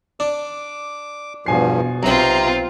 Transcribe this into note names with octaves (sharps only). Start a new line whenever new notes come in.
D4 D6
E2 G2 B2 F3 G#5 C7
B1 C3 C4 F4 B4 A#5